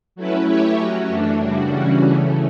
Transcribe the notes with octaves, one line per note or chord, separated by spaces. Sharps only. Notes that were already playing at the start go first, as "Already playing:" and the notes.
F#3 A3 C#4 E4 B4
A3 E4 G4 C#5 E5
F#3 C#4 F#4
F#2 E3 A3 D4
F#2 C#3 G3 D4 F#4
C#3 E3 G3 C#4 F#4
C#3 E3 A3